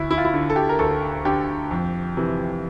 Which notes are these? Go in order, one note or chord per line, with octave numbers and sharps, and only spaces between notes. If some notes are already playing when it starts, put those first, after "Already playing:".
Already playing: D2 E4
E4
F4
E4
D3
A4
G4
A#4
D2 A4
D3 G4
F2
C3 E3